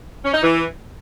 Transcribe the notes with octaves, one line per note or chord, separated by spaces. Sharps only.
C#4
D#4
E3